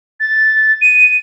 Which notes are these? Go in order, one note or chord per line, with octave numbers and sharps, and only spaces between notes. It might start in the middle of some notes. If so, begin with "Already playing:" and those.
A6
D#7